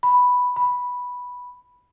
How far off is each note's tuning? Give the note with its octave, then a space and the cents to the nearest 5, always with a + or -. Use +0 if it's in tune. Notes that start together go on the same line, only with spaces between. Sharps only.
B5 +0
B5 -5